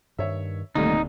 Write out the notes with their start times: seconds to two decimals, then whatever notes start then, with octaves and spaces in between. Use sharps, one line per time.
0.19 G2 D#3 C#5 E5
0.75 D1 C2 A#2 D3 D#3 G3 A3 D#4